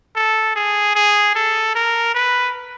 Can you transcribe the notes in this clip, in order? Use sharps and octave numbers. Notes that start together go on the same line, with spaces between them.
A4
G#4
G#4
A4
A#4
B4